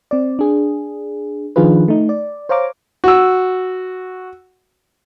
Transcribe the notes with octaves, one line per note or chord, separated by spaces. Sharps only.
C4 D5
D4 G#4
D#3 F3 D4 F4 G#4 B4
A3 D#4
D5
C5 C#5 F5 A#5 D6
F#4 E6